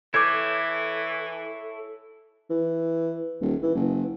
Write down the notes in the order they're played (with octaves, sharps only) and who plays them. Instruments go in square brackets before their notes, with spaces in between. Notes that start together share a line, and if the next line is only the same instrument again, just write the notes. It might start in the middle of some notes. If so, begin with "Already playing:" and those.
[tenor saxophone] E3 [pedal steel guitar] E4 C#5 G6 [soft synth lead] A4 [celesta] D6 G#6
[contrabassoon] E3
D#1
E3
F#1